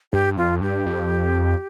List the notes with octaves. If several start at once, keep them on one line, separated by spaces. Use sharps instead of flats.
G2 G4
F2 F4
G2 G4
F2